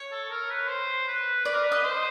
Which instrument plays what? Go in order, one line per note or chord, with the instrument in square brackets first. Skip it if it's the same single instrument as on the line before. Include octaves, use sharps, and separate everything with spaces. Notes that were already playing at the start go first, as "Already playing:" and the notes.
Already playing: [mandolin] C#5
[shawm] A4
A#4
B4
C5
B4
[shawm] B4 [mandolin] D5
[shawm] A#4
B4
[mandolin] D#5
[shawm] C5